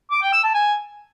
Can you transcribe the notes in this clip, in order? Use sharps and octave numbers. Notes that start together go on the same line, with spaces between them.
D6
G5
E6
A5
G#5